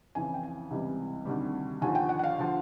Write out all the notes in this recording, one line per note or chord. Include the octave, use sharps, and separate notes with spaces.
F2 C#3 E3 G#5
G5
G#5
C#2 C3 E3 G3
D2 C3 D#3 G3
D#2 D3 F3 G#5
G5
F#5
F#5
F5
D3 F3